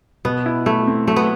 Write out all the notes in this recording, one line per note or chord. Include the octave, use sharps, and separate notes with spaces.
B2 B3
E4
A3 E4
C4
F#3 A3
B3